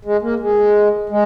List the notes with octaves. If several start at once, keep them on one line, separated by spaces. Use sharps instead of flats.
G#3
A#3
G#3
G#3